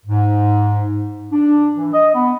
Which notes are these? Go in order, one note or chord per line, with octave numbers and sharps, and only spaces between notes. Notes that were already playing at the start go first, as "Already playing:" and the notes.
G#2
D4
E3
D#5
B3